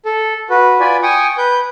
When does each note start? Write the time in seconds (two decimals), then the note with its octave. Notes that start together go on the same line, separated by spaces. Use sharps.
0.05 A4
0.50 F#4 B4
0.80 F4 D5 G#5 B5
1.03 G5 G#5 C#6 D#6
1.38 B4 G6